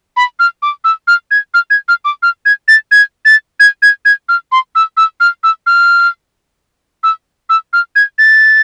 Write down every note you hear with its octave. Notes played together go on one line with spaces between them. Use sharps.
B5
F6
D6
E6
F6
G#6
F6
G#6
F6
D6
F6
G#6
A6
G#6
A6
G#6
G#6
G#6
F6
C6
E6
E6
F6
E6
F6
E6
E6
F6
G#6
A6